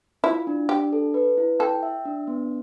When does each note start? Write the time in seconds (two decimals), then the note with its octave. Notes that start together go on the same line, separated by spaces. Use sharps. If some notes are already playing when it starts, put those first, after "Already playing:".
0.23 E4 F4
0.47 D4
0.69 D4 G4
0.93 A4
1.14 B4
1.37 E4
1.59 A4 G5
1.83 E5
2.05 D4
2.27 B3